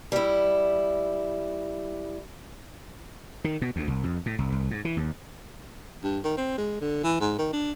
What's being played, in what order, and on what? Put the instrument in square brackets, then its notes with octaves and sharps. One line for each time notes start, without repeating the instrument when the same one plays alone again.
[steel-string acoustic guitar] G3 E4
[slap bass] D#3
B2
D2
C2
F2
A2
C2
C2
G#2
E3
D#2
[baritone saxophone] G2
D#3
C4
G#3
D3
E3
G#2
D#3
D4